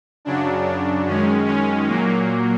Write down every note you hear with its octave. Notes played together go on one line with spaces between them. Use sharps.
F#2 C#3 F#3 D4
D4
F#2 D#3 G#3 C#4
C#4
A#2 F#3 A#3